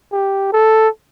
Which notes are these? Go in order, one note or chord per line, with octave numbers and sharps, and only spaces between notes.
G4
A4